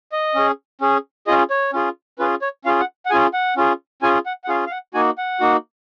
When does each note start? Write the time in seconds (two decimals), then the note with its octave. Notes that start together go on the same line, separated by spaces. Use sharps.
0.12 D#5
0.35 C#4 G#4
0.81 C#4 G#4
1.27 C#4 F4 G#4 D#5
1.50 C#5
1.73 C#4 F4 G#4
2.19 C#4 F4 G#4 B4
2.42 C#5
2.65 C#4 F4 G#4 F5
2.80 F#5
3.06 F#5
3.10 C#4 F4 G#4 G#5
3.34 F#5
3.57 C#4 F4 G#4
4.02 C#4 F4 G#4 G#5
4.26 F#5
4.44 F#5
4.48 C#4 F4 G#4 F5
4.66 F5
4.71 F#5
4.94 A#3 D#4 F#4 G#5
5.18 F#5
5.40 A#3 D#4 F#4